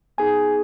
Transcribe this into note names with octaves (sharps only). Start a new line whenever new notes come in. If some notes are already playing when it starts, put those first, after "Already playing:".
B3 D#4 G#4 G#5